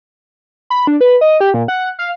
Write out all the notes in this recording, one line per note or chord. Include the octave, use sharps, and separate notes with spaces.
B5
D4
B4
D#5
G4
A#2
F#5
F5